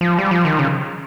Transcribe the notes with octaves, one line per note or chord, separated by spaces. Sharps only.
F3
G3
F3
D#3
C#3